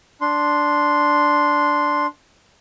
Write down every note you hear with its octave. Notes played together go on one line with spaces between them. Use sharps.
D4 C6